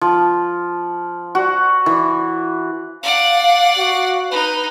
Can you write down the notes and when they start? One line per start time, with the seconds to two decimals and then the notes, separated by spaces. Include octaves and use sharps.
0.01 F3
1.35 F#4
1.86 E3
3.03 D5 F5 F#5
3.78 F#4
4.31 D#4 B4